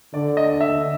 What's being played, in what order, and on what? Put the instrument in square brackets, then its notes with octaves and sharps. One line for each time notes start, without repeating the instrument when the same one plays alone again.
[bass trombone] D3 [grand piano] D5
[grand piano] D#5
E5